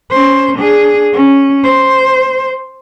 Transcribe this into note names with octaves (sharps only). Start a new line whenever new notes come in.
C#4 C5
D4 G#4
C#4
C5